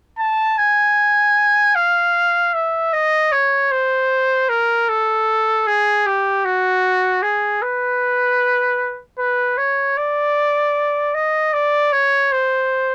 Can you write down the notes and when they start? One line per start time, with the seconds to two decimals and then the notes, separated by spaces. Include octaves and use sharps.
0.19 A5
0.58 G#5
1.75 F5
2.54 E5
2.93 D#5
3.32 C#5
3.71 C5
4.49 A#4
4.88 A4
5.67 G#4
6.06 G4
6.45 F#4
7.22 G#4
7.62 B4
9.18 B4
9.58 C#5
9.97 D5
11.14 D#5
11.53 D5
11.92 C#5
12.32 C5